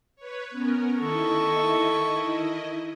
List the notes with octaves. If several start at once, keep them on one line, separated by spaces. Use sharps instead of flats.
B4 C#5
B3 C#4 A#4
D#3 E4 A4 D#5 C#6